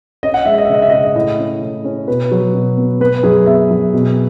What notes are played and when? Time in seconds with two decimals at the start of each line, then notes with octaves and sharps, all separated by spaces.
0.23 C#4 D#5
0.34 F#5
0.46 G#3 E5
0.58 D#5
0.65 E5
0.69 C#3 D#5
0.82 E5
0.90 C#3 D#5
0.97 E5
1.05 D#5
1.15 A2 D#5
1.39 C#4
1.62 A2
1.84 C#4
2.07 B2 B4
2.31 F#3
2.54 B2
2.78 B3
3.00 B3 B4
3.23 F#2 G#4
3.46 B3 E5
3.70 F#2
3.93 B2